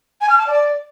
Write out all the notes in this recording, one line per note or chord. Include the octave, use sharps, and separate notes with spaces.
G#5
F6
A5
D5